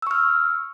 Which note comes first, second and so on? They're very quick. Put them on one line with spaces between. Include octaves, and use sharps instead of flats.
E6 C#6 F6